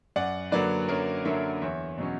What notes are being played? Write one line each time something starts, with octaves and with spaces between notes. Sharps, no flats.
F#2 D5 F#5
D3 F#3 A#3 B4 D5
F#2 A#4 C#5
D3 F#3 A#3 C#5 E5
E2 C#5 E5
B2 F#3 C#4